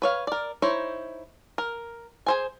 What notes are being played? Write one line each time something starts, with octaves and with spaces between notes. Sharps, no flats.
B4 C#5 F5
A#4 D5
D#4 E4 C5 C#5
A#4
G#4 C5 G#5